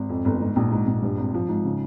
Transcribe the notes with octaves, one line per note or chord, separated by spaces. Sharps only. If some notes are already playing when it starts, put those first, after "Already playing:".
Already playing: G#1
F2
G1
G#2
A#1
G#2
A#1
G2
G#1
F3
G#2
C#3